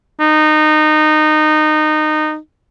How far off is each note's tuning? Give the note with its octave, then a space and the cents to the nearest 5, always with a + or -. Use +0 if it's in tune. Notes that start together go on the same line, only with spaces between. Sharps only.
D#4 -20